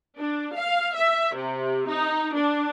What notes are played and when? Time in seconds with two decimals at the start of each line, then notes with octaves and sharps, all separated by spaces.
0.18 D4
0.54 F5
0.94 E5
1.34 C3
1.88 D#4
2.34 D4